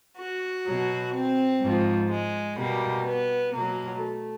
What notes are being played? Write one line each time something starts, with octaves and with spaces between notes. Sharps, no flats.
F#4
B2 F#3
C4
G#2 F3
G#3
B2 G3 A#3
B3
B2 F#3 A#3
A3